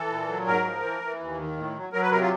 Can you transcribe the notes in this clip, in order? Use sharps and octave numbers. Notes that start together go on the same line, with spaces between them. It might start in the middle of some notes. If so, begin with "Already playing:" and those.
Already playing: E3 A4
A#2
F#3
G#2 A#4
F3
E3
E3
D#2
D#3
A2
F#3
F#3 A#4
B4
C3 A#4
F4